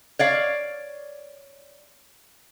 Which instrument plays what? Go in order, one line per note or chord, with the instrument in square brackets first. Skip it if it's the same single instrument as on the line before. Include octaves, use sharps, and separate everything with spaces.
[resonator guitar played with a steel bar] C#5 D5 F5